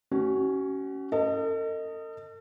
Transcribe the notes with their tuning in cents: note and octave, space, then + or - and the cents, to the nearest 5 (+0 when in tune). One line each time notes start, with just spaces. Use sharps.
C#4 +0 F#4 +35
A4 +45 D#5 +0